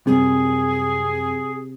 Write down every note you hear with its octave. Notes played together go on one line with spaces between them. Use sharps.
F#2 C3 G3 C4 G#4